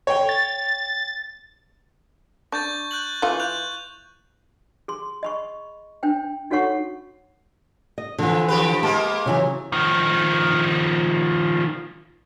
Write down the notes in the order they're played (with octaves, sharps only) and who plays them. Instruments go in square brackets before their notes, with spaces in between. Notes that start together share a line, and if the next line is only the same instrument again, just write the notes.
[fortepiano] C#5 G5
[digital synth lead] A6
[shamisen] D4 [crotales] C#6 G6 A6
[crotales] F#6 G6 F#7
[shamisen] E3 F4
[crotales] F#6 G6 F7
[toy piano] G#4 C6
D#5 B5 C#6
D4 C5 G5
D#4 F#4 A4 C#5 F#5 C#6
[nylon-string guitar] D#5
[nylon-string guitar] D3 E3 [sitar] F3
[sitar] F3 G4 B4
[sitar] G#3 A#3 B3 [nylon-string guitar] A5
[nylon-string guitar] C#3 E3 F#3
[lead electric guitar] D#3 F3